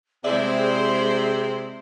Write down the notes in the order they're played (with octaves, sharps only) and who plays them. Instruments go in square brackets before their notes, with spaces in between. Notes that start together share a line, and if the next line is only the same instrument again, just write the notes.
[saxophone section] C3 C4 [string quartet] G#3 E4 C5 [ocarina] G#4 [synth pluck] D5 E5